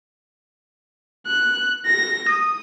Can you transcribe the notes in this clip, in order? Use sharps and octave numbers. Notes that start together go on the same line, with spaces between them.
F#6
A#6
D#6